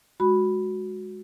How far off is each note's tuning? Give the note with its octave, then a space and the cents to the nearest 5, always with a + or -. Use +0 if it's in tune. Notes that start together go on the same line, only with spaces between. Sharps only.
G#3 +0 F#4 -5 B5 +0